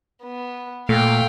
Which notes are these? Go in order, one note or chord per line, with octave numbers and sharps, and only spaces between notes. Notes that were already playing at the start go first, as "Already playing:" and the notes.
B3
A#2 A3 F5 G5